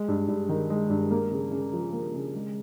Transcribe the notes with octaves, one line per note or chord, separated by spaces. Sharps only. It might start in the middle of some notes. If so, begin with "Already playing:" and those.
Already playing: G#3
G2
G2
D#3
G#3
G2
A#3
C#3
C#3
F3
A#3
C#3
G#3